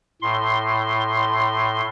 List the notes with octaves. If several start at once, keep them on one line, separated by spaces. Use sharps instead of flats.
A2 C6